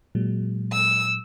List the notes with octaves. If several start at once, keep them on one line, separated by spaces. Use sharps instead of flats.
A#2 F#3 G#3
E6